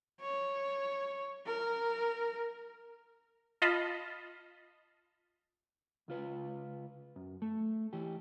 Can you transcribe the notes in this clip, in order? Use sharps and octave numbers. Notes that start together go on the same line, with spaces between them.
C#5
A#4
F4 D#5 F5 A5 B5
C#2 F4 B4
F#2
A3
E3 G4